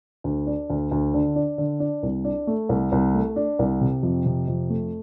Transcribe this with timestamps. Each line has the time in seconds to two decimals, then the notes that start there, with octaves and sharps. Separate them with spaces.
0.24 D2
0.47 D4
0.70 D2
0.91 D2
1.14 D3
1.36 D4
1.58 D3
1.80 D4
2.03 C2
2.25 D4
2.47 A3
2.69 C2
2.92 C2
3.14 A3
3.36 D4
3.59 C2
3.81 C3
4.03 F2
4.25 C3
4.48 F2
4.70 A3